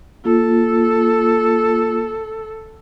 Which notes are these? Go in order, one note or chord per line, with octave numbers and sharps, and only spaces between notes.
A#3 F4 A4